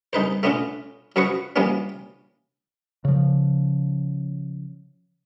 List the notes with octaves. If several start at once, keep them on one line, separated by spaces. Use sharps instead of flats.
C2 D#4 B4 C5
A3 B3 C#4 D4 F4
F#2 F3 F#4 B4 C#6 D#6
E3 F3 G3 A#3 B3 C#4
C#3 F3